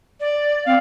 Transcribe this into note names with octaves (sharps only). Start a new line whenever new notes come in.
D5
C4 D5 F5